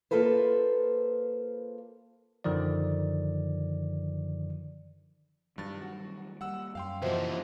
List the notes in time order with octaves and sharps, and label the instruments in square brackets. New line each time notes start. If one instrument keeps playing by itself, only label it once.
[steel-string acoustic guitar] A#3 F4 A4 B4 C5
[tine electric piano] F#2 D3 D#3 F3 D5
[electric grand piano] G2 A6 [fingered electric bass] D#3 F#3 G3
[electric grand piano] F#4
[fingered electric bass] G3 A#3 [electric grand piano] F#5 E6
[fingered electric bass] F#2 [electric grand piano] F5 G5 C6
[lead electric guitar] D#2 F3 [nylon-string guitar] E3 F#4 C5 [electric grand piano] D#5 E5